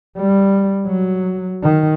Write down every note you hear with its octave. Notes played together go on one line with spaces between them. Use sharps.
G3
F#3
D#3